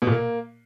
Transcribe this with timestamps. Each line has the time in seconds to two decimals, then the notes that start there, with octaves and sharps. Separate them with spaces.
0.02 B2
0.07 A#2
0.12 A#3